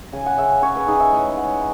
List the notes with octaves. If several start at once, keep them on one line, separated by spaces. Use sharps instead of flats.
C#3 G#5
F#5
C#3 E5
C#3 C#5
B4
D#4 G#4
E5
A2 D#5
G#3 F#5